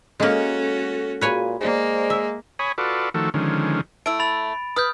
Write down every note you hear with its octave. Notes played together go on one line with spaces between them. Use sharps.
G#3 A#3 C#4 F#4 A4
A#2 F#4 G#4 B4 C#5 F5 G#5
G#3 A#3 C5 D5
E5
C#5 G#5 B5 D#6
F4 F#4 A4 B4 D5
D#3 F3 A3 F#4 A4
D3 D#3 F3 G#3 C#4
A3 E4 D7
B5 A6 F7
B4 D#6 F6 G6